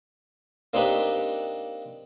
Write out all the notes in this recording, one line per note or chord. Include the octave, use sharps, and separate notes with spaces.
A#3 C4 D4 D#4 G4 B4